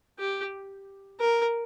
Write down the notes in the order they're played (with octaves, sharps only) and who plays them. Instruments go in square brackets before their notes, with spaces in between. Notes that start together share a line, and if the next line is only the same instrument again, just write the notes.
[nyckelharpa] G4
A#4